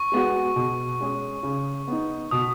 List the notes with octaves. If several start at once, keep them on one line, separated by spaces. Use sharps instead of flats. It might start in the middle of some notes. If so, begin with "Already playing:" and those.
Already playing: C#6
G#3 B3 F#4
B2
G#3 C#4 G#4
C#3
B3 D#4
B2 D#6